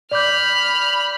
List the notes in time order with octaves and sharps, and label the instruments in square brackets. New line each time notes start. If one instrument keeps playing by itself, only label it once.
[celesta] D5 D6 G6 [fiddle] B5 F6